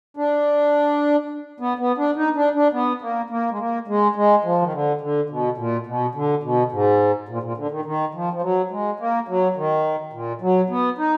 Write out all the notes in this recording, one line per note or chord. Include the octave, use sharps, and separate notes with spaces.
D4
B3
B3
D4
D#4
D4
D4
B3
A#3
A#3
G#3
A#3
G#3
G#3
F3
D#3
D3
D3
B2
A#2
B2
D3
B2
G#2
A#2
A#2
D3
D#3
D#3
F3
F3
F#3
G#3
A#3
F#3
D#3
A#2
F#3
B3
D#4